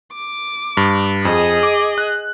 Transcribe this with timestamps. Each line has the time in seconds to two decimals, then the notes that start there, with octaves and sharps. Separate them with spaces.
0.14 D6
0.77 G2
1.25 F2 G#4 D#5
1.63 D6
1.98 F#6